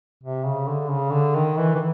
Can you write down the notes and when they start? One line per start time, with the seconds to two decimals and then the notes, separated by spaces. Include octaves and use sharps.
0.24 C3
0.46 C#3
0.68 D3
0.90 C#3
1.13 D3
1.35 D#3
1.58 E3
1.75 E3